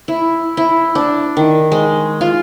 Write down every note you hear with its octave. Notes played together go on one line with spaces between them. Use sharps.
E4
E4
D4
D#3
G#3
F4